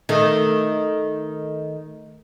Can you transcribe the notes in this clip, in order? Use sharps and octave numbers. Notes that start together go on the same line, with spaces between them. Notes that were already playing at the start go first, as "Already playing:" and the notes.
D#3 A3